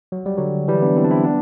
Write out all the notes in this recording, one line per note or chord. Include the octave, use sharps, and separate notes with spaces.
F#3
G3
D3 F#3
E3 G3
B3 D4
C4 E4
D4
C4 E4
B3 D4